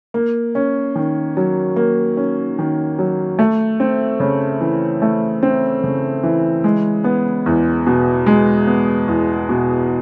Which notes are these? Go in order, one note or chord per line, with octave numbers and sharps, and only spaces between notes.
A#3
C#4
D#3
F#3
A#3
C#4
D#3
F#3
A3
C4
C#3
E3
A3
C4
C#3
E3
G#3
B3
E2
B2
G#3
B3
E2
B2